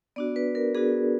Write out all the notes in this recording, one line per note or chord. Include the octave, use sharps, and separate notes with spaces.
B3 D4 F#4 D5
B4
A#4
B3 D4 F#4 G#4